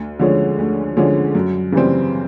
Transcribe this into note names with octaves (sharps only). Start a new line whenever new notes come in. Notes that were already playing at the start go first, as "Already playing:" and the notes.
Already playing: D2
D3 F3 G#3 C#4
D2
D3 F3 G#3 C#4
F#2
C#3 E3 G3 C4